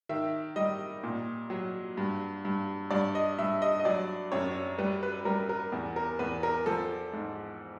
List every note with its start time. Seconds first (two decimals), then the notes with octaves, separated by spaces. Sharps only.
0.09 D#3 E5
0.56 G3 D#5
1.03 A#2
1.50 F#3
1.97 G2
2.45 G2
2.91 G2 D5
3.15 D#5
3.39 G2 E5
3.62 D#5
3.79 D#5
3.85 F#3 D5
4.32 F#2 C#5
4.78 G3 B4
5.03 B4
5.25 G3 A#4
5.49 A#4
5.72 E2
5.96 A#4
6.19 E2 B4
6.43 A#4
6.66 F3 A4
7.13 G#2